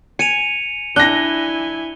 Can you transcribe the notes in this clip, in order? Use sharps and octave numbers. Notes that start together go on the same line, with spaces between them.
G#5 C#7 D#7 F7
D4 E4 G#5 F#6 A#6 G7